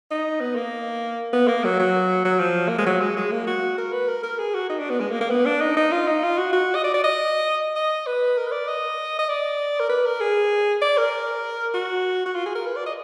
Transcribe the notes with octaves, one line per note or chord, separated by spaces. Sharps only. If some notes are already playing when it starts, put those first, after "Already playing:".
D#4
B3
A#3
B3
A#3
F#3
F#3
F#3
F3
A#3
G#3
F#3
G#3
G#3
A#3
F#4
A#4
B4
A#4
A#4
G#4
F#4
D#4
D4
B3
G#3
A#3
A#3
B3
D4
D#4
D#4
F4
D#4
F4
F#4
F#4
D#5
D5
D5
D#5
D#5
B4
A#4
B4
D5
D#5
D#5
D5
A#4
B4
A#4
G#4
D5
A#4
F#4
F#4
F4
G#4
A#4
B4
D5
D#5